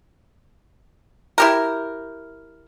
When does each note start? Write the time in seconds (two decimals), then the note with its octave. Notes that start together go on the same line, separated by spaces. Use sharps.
1.38 E4 G4 A#4